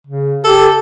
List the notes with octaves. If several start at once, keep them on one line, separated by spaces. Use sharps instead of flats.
C#3
G4 A4